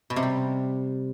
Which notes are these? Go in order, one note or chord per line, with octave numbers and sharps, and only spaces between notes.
B2
C3
G3